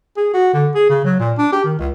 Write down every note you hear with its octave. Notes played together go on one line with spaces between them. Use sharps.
G#4
F#4
D3
G#4
C#3
F#3
A#2
D4
G4
D#3
C#2